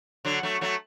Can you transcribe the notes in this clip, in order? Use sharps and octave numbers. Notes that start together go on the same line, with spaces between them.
D3 F#3
F#3 A3
F#3 A3